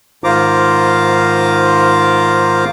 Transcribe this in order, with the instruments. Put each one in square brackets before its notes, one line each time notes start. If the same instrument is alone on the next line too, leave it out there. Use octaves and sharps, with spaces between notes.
[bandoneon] G#2 D#3 F4 C5 A#5 D6